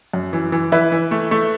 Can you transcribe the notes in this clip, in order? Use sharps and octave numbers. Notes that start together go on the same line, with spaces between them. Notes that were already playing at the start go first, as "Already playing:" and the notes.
F#2
E3
E3
E3 B4 E5
E3
A3
A3